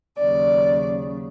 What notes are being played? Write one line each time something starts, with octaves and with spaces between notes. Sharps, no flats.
D#2 C#3 F#3 D5